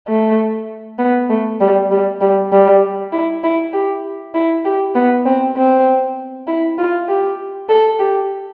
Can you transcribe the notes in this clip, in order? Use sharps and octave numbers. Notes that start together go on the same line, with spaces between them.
A3
B3
A3
G3
G3
G3
G3
E4
E4
G4
E4
G4
B3
C4
C4
E4
F4
G4
A4
G4